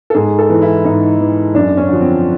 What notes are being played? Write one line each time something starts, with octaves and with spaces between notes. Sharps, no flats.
A4
G#2 G#4
A4
E3
E4
G#2 D#4
E3
F#2 D4
C#4
D3 F3
C4